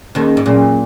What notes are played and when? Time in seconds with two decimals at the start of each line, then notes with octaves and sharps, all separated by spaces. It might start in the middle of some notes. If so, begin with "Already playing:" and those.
0.15 D#2 D#3 C#4 G#4 D#5
0.37 G#2
0.45 A#2 F#3 C#4 G#4